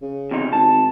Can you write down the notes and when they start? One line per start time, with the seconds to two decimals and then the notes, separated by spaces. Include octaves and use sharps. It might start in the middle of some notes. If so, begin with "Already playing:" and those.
0.02 C#3
0.31 E2 C3 D#4
0.53 G#1 A5